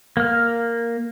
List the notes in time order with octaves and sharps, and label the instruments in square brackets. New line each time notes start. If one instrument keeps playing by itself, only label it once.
[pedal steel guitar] A#3 F6